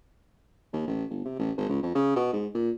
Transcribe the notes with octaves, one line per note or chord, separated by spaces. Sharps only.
D#2
A1
G1
C3
A1
G#1
C#2
F2
C#3
B2
G#2
A#2